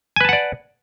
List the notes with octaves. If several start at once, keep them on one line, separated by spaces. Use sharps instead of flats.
B4 D5 F#5 G#5 A5